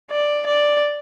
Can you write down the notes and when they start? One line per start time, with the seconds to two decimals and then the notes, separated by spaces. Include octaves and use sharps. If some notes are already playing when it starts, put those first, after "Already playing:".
0.10 D5
0.46 D5